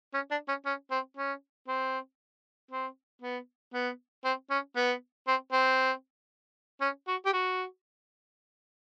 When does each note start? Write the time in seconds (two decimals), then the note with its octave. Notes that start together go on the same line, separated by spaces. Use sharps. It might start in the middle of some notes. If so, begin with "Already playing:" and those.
0.14 C#4
0.31 D4
0.48 C#4
0.66 C#4
0.91 C4
1.17 C#4
1.68 C4
2.71 C4
3.22 B3
3.74 B3
4.25 C4
4.50 C#4
4.77 B3
5.27 C4
5.52 C4
6.81 C#4
7.07 F#4
7.26 G4
7.33 F#4